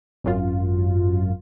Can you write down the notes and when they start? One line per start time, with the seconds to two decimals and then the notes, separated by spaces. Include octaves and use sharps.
0.24 G#1 F#2 F4